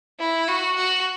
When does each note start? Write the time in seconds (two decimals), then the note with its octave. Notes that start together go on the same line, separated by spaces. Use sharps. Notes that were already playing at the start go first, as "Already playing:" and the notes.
0.20 E4
0.48 F#4
0.76 F#4